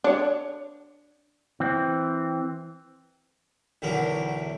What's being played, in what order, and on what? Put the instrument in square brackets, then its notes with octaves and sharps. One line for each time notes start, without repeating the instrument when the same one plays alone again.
[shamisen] D4 C#5
[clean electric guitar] E3 C4
[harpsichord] B1 E2 D3 F#3 E4 A#4